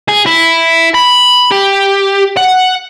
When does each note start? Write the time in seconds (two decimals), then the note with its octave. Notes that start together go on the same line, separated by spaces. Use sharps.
0.09 G#4
0.26 E4
0.95 B5
1.51 G4
2.37 F#5